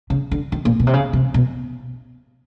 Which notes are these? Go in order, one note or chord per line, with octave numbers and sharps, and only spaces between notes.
C#3
D3
D#3
A#2
B2
C3
C#3
C3
B2